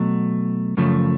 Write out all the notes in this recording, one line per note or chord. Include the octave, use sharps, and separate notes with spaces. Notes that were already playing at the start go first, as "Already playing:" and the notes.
Already playing: B2 F#3 A3
F#2 C#3 F3 A3